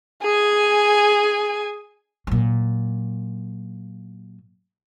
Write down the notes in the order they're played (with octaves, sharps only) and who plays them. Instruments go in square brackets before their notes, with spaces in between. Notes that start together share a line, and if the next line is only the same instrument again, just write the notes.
[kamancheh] G#4 G#5
[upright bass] A#2 F#3